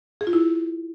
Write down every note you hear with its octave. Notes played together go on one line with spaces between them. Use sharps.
G#4
F4
E4